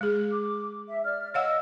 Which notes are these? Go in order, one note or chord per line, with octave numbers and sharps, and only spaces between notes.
G#3 G#4
D6
E5
D5 F6
C#5 D#5 F5 F#5 E6